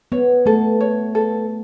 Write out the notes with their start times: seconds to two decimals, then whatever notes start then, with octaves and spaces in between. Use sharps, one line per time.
0.12 B3 C#5
0.46 A3 A4
0.81 C#5
1.15 A4